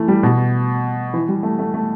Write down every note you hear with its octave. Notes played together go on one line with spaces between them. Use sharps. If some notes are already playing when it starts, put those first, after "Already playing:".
Already playing: E3 A3
G3
B2
E3
G3
A3
A3
A3